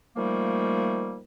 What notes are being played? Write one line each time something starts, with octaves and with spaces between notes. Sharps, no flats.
D#3 F3 G3 A3 A#3